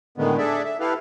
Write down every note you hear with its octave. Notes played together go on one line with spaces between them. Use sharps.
A2 D3 D#3 G#3 B3
D4 G#4 A4 D5 E5
E5
E4 G4 A4 B4 F5